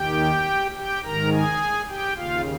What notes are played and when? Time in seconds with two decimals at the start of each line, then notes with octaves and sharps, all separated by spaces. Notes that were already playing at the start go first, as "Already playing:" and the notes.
Already playing: D#2 D#3 G4 G5
0.76 G4 G5
1.04 G#2 D#3 A#4 A#5
1.31 G#4 G#5
1.88 G4 G5
2.16 D#2 C#3 F4 F5